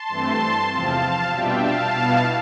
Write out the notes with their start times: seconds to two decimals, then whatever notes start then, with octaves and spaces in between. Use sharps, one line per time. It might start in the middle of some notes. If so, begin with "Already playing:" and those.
Already playing: A5 C6
0.09 G2 E3 A3 C4
0.70 E2 C3 F3 C4 F5 A5
1.32 B2 G3 D4 F4 E5 G5
1.63 F5 A5
1.94 B2 B3 E4